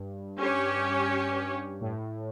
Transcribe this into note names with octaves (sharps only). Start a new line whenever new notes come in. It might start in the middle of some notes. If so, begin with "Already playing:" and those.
Already playing: G2
C#4 G4 C#5
A2